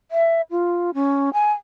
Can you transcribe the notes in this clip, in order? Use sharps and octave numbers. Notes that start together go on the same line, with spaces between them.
E5
F4
C#4
G#5